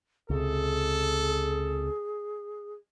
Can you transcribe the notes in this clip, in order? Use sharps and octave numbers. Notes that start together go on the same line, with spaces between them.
C#2 C3 G#4 A4